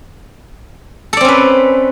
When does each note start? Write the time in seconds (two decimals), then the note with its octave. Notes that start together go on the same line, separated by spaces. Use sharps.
1.13 A4
1.17 D5
1.21 C4
1.25 C#4
1.28 B4